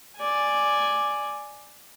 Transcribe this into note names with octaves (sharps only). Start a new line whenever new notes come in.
D5 G#5